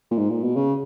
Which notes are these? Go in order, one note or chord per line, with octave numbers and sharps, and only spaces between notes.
A#2
G#2
A#2
B2
C#3